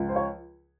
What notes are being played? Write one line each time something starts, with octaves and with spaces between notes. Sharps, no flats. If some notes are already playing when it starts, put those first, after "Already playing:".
Already playing: C#2 F3
C5
C#5